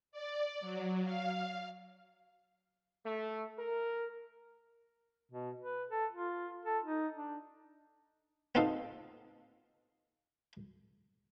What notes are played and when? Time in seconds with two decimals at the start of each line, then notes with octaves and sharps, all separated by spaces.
0.12 D5
0.61 F#3
1.04 F5
3.06 A3
3.59 A#4
5.32 B2
5.61 B4
5.89 A4
6.12 F4
6.65 A4
6.84 D#4
7.13 D4
8.55 B3 C4 D#4 F4 A4 F5